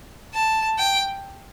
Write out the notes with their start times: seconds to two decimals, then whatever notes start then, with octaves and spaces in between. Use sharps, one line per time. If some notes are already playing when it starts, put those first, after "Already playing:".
0.34 A5
0.78 G5